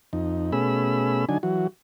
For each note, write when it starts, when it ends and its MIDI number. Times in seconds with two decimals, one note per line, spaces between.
0.13 0.52 41
0.13 0.52 63
0.52 1.25 47
0.52 1.25 57
0.52 1.25 61
0.52 1.25 68
0.52 1.25 83
0.52 1.25 88
1.29 1.38 50
1.29 1.38 54
1.29 1.38 62
1.29 1.38 63
1.29 1.38 80
1.43 1.67 52
1.43 1.67 54
1.43 1.67 66